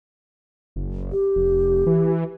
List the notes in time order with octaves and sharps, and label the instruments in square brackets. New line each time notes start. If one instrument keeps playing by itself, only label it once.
[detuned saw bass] F#1
[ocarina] G4
[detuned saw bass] F1
E3